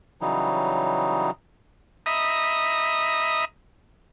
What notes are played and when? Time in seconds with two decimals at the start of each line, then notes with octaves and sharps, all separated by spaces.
0.21 C#3 E3 F#3 G3 D#4
2.06 D#5 E5 A#5 B5 D#6